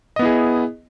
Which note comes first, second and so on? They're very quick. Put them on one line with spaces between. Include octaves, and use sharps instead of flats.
D#5 B3 E4 G#4